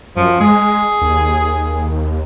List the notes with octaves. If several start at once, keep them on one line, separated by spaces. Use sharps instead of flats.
F#2 F3
G#3 G#4
D#2